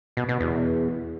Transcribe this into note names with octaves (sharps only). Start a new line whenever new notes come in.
B2
B2
E2